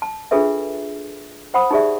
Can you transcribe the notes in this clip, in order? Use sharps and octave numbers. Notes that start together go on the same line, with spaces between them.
A5
D4 F4 G#4 A4 B4 E5
C5 F#5 B5 D#6
D#4 G4 G#4 D5 E5